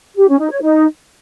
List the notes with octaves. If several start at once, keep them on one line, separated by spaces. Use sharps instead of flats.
G4
C#4
D#4
C#5
D#4